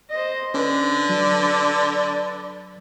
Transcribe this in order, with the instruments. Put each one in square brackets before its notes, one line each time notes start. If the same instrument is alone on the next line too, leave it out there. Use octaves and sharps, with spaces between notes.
[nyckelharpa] C5 D#5
[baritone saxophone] D3 [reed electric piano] C#4 D4 [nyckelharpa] B4
[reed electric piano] F#3 [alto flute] D5